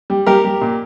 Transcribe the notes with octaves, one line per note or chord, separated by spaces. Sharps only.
G3
G3 G4 A#4
G3
A#2